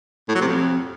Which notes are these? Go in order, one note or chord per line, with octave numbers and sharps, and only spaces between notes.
A2
F#3
C3
F2